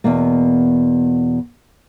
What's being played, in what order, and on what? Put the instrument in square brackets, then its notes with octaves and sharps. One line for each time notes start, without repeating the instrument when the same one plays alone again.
[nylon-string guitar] E2 B2 A#3